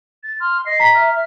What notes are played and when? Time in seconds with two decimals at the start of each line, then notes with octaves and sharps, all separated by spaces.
0.23 A6
0.40 C6 F6
0.66 D#5 C7
0.80 A#5 B6
0.95 E5 F6
1.11 E5